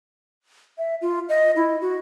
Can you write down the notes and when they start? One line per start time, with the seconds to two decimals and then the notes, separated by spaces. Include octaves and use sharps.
0.78 E5
1.01 F4
1.29 D#5
1.56 E4
1.82 F#4